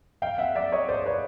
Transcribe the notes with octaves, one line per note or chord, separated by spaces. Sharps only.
F5 G5
E5 F#5
D5 E5
C#5 D#5
C5 D5
B4 C#5